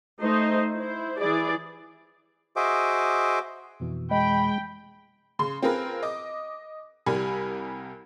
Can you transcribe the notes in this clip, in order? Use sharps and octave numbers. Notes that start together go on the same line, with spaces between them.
A3 D#4 C5 D#5 C6
E4 C5
E3 E4 G#4 D5
F#4 G#4 C5 D#5 E5 D6
F2 B2 E3
G#3 G5 B5
C#3 C6
C4 F4 G#4 A#4 B4
D#5 D6
C2 G3 A#4 G#5 B5